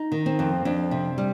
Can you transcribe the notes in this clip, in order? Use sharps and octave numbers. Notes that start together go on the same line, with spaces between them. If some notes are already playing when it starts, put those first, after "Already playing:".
Already playing: D#4
D#3
C4
F2
F2 D4
C3
G3